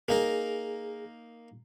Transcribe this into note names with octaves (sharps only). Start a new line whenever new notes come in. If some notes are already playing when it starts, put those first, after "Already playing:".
A#3 D#4 G#4 A#4